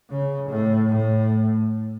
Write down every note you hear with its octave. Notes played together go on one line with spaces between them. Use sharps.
C#3
A2
A2